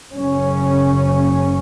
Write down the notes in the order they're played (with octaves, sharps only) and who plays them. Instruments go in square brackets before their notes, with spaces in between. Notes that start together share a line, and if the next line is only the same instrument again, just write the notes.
[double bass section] F#1 F#2 C#3 C#4